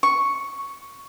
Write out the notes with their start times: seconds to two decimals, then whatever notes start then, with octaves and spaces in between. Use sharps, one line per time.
0.03 C#6